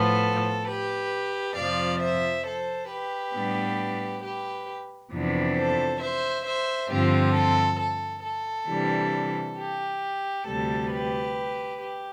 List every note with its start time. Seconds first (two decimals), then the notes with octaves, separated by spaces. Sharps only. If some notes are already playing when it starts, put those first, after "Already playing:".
Already playing: A2 F3 B3 A4
0.67 G4 B4
1.56 F2 C3 F3 D5 F5
2.01 C5 E5
2.45 A4 C5
2.90 G4 B4
3.34 A2 G3 B3 D4
4.23 G4 B4
5.12 F2 C3 E3 B3 D4
5.57 A4 C5
6.01 C5 E5
6.46 C5 E5
6.90 G2 D3 F3 C4 F4 G4
7.35 A4
7.79 A4
8.24 A4
8.68 C3 E3 G3 D4
9.58 G4
10.46 D2 C3 G3 A4
10.91 G4 B4
11.80 G4